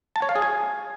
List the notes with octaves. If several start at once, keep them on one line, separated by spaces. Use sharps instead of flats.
A5
C#5
F5
G#4
G#5